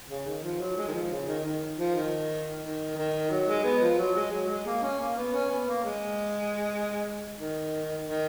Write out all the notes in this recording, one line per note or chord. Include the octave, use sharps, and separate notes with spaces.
C#3
D#3
F3
F#3
G#3
D#3
F3
C#3
D#3
D#3
F3
D#3
D#3
D#3
F#3
G#3
B3
F3
F#3
G#3
F#3
G#3
A#3
C#4
A#3
B3
C#4
B3
A#3
G#3
D#3
D#3